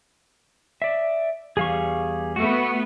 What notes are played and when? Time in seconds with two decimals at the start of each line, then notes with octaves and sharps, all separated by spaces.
0.82 D5 E5
1.57 E2 G3 G#4 F5 C#6
2.36 A3 B3 F#4